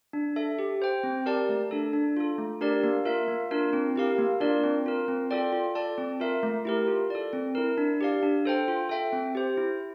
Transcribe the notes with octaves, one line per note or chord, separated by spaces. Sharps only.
D4
A4 E5
G4
C5 G5
C4
G4 A#4 D5 A5
A3
D4 A4
D4
F4 A4
A3
D4 G4 A#4 D5
A#3
F4 A#4 E5
A#3
D4 F4 A#4
C4
E4 G4 A#4 F5
A#3
D4 F4 A#4 D5
C4
F4 A#4
C4
F4 A4 D5 G5
F4
A4 D5 A5
C4
F4 A#4 E5
A3
E4 G4 A#4
F4
A4 D5
C4
E4 A#4
D4
G4 D5 F5
D4
A4 C5 G5
F4
A4 E5 G5
C4
G4 C5
E4